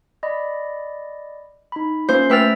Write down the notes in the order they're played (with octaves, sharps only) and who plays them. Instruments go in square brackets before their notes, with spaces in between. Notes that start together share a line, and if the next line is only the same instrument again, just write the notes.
[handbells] D5 D#5 B5
D#4 B5
[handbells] A#3 C#4 F4 [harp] C5
[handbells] A3 G5 A6 [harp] B4 E6 F6